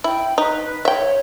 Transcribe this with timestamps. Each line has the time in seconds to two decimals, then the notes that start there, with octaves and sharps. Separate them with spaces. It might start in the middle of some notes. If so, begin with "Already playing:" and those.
0.04 E4 G5
0.38 D#4 B4
0.85 C#5 E5 G5